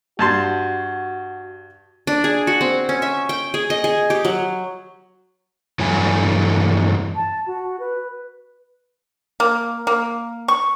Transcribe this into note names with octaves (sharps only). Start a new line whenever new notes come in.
G2 F#4 A5 C6
D4
G#4
F#4
C4
C#4
E5
G5
G#4
D#5
G#4
G4
F#3
G2 E3 F#3 A3 G#5
A5
F#4
B4
A#3
A#3
C#6